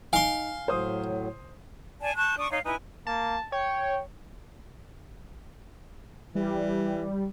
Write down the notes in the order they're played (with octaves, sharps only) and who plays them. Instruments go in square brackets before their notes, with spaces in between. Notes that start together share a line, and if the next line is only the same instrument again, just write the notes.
[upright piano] D#4 [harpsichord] F5 C6 [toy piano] G#5
[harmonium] A2 F#3 [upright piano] C5 D#6
[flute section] D5 G#5 A5
A5 C#6 F#6 G6
D4 C#6 D#6
D#4 C#5 F5
D#4 E4 B4 G#5
[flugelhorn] A#3 [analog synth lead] A5
[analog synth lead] C#5 [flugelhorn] G5
[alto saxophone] E3 [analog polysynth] G3